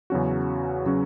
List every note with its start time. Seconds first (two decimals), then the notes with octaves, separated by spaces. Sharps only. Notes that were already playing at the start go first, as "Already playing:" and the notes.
0.10 E2 C#3 F#3 C#4 F#4
0.86 C#3 F#3 C#4 F#4